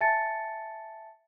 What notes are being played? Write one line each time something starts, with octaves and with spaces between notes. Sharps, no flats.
E5 G#5 A5 A6 C#7